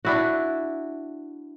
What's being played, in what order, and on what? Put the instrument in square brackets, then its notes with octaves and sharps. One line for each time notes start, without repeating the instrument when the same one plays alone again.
[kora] D4 E4 F#4